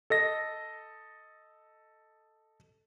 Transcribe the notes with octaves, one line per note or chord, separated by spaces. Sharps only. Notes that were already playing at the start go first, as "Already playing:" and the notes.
A4 D#5 A#6